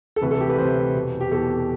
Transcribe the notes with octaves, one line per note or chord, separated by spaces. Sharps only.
A4
D2 C3 E3 B4
A4
G4
B4
D2 C3 E3 C5
E2 B2
G4
E2 B2 A4